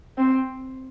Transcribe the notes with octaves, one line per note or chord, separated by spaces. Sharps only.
C4